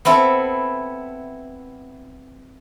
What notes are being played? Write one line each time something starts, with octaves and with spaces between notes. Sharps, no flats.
B3 C4 E4 A4